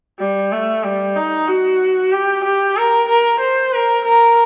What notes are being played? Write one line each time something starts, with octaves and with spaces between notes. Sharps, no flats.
G3
A3
G3
D#4
F#4
G4
G4
A#4
A#4
C5
A#4
A#4